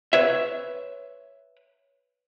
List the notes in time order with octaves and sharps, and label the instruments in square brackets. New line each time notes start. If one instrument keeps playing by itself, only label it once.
[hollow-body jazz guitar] B4 C#5 E5